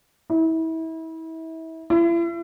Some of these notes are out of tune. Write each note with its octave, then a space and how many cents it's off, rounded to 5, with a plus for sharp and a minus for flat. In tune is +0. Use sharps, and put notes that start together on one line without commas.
E4 -30
E4 +40